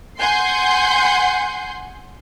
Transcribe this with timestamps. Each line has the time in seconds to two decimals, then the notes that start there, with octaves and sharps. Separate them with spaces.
0.20 F#5 G#5 C6 G6 C7